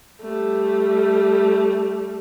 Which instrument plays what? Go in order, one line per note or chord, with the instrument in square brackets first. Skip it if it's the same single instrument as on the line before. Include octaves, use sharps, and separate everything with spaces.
[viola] G3 A3